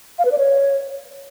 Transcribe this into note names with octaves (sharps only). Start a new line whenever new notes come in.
F5
B4
D5
C#5